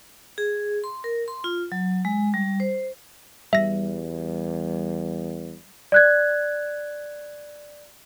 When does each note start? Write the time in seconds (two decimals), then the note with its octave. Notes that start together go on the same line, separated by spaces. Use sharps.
0.38 G#4
0.84 C6
1.04 A#4
1.28 C6
1.44 F4
1.72 F#3
2.05 G#3
2.34 G3
2.60 C5
3.53 E2 G3 E5 A#6
5.92 D5 F#6 G#6